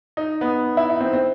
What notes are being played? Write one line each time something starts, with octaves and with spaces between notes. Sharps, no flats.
D#4
B3
E4
D#4
C4
C4